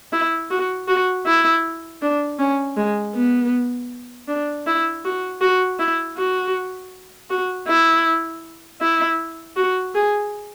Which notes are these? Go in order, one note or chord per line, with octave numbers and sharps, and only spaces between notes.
E4
F#4
F#4
E4
D4
C#4
G#3
B3
D4
E4
F#4
F#4
E4
F#4
F#4
E4
E4
F#4
G#4